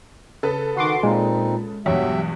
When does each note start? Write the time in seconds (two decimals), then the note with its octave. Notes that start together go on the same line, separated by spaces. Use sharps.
0.43 C#3 A4 B4
0.77 D#3 F#4 F#5 C6 D6
1.03 A#2 G#3 C4 D#4
1.86 E2 G2 B2 F#3 G4 E5